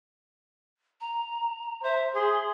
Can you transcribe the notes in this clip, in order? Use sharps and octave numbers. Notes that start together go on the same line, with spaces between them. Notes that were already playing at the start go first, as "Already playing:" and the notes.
A#5
C5 E5
G#4 C6